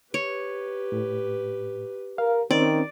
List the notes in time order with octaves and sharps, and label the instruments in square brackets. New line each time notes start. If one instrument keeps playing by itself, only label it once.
[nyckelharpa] G4 B4 [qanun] C#5
[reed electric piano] A2
[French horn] A#4 [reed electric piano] F5
[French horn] D#3 [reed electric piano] C4 C#4 [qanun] D5